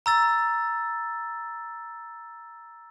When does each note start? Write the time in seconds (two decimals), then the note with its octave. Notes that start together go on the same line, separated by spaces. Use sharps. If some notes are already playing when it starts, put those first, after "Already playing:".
0.06 A#5 E6 A6